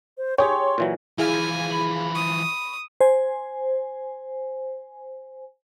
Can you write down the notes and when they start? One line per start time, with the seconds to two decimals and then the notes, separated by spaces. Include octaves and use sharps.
0.18 C5
0.38 G4 G#4 C#5 G5 C6
0.78 A#2 E3 F#3
1.18 E3 F3 E4 G#4 F5 G#5
1.72 B5
2.15 C#6 D#6
3.01 C5 G#5